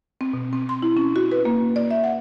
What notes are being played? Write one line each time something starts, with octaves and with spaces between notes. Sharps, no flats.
C4
B2
C4
C6
E4
C#4
F#4
B4
A#3
D5
E5
F#5